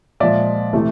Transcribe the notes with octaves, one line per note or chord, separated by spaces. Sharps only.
A#2 F3 G#3 D5 E5
C3 E3 A3